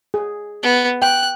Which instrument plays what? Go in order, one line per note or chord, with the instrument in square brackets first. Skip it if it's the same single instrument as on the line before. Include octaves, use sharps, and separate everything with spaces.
[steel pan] G#4
[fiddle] B3
[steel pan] G5 [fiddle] F#6